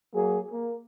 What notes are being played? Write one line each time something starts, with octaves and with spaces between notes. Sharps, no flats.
F#3 A#3 G#4
A#3